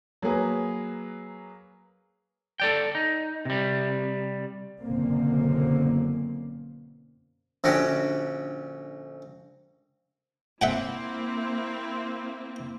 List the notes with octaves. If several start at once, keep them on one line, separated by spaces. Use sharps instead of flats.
F#3 A#3 G#4 B4
A4 D5 G5
D#4
C3 G3
F#1 F#2 B2 D3 A#3 C4
A#1 D3 C#4 F#4 G4
A#3 C4 E4 E5 F#5 G5